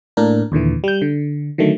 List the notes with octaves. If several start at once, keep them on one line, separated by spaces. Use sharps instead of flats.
A2 A#3 D4 A#4
D#2 A#2 D3 E3
G3 G6
D3
D3 D#3 F#3 A3